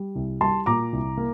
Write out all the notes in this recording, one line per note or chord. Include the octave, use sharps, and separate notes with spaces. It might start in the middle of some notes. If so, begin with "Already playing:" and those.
Already playing: G3
C2
G3 A5 C6
A#2 A#5 D6
C2
A#3